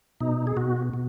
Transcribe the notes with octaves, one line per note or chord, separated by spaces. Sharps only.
B2 D#4
G#4
B2 F#4
B2